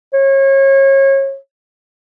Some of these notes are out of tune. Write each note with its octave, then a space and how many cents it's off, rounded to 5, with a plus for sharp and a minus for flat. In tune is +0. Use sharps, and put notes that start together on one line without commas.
C#5 -30